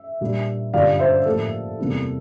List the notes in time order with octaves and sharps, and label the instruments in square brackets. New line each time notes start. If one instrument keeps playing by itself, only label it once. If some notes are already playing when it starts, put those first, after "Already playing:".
Already playing: [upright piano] E5
A#2 G3 A#3 D4
G2 D3 G3 D4 F4 D5 F5
C5 E5
A2 F3 A#3 A4
E2 C3 G3 A#3 E4